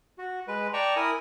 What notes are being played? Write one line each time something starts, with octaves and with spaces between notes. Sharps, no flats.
F#4
G#3 B4
D5 G5 A5 A#5 C#6
E4 A#4 G#5 D#6